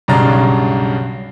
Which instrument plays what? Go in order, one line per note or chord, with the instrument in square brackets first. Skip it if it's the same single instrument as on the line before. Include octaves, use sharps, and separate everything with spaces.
[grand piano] B1 G2 C#3 D4 A#5 A6